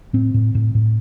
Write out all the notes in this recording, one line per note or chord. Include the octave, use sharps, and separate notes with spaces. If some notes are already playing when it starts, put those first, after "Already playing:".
A2 C4
A2
A2
A2